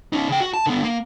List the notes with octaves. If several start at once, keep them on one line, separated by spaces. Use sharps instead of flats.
C#4 D#4
C#3 G5
F#4
A5
D3 B3
A#3